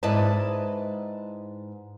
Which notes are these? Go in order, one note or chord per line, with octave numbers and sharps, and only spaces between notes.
G#2 E4 B4 D5 D#5 A5